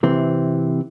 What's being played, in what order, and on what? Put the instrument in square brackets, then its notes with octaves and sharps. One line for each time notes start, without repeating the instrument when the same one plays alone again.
[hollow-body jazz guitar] C3 E3 C4